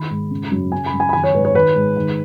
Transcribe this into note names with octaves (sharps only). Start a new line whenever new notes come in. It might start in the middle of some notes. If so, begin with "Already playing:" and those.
Already playing: D#3 B5
G#2
C#3
F#2
C#3 G#5
B5
F#2
G#5
B5
D#3 G#5
C#5
G#2 B4
C#5
D#3 B4
G#2
D#3